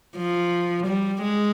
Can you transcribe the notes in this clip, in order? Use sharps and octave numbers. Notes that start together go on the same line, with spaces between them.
F3
G3
G#3